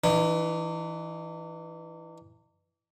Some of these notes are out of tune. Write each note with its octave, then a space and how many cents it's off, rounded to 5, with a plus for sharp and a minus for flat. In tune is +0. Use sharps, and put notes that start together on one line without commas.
E3 +0 D#4 -45